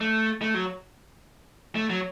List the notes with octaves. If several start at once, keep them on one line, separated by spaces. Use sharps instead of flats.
A3
A3
F#3
A3
F#3